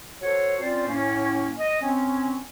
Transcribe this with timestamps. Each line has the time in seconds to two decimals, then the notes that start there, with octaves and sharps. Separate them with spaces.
0.22 F#4 A4 C5 C#5
0.61 C4 C#4 F4 C5 D5
0.87 A2 A#3 C#4
1.59 D#5
1.82 C4 C#4